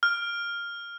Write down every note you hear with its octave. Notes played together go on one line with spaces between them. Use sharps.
F6